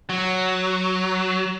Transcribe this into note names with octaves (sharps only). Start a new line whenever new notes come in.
F#3